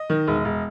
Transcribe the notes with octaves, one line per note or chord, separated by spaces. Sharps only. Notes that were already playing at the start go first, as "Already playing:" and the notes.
Already playing: D#5
D#3
E1
E1